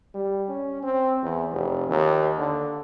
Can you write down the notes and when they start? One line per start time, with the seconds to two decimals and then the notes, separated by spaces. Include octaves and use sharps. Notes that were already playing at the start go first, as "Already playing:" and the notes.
0.14 G3
0.49 C#4
0.83 C4
1.23 E2
1.52 F1
1.89 D#2
2.38 D3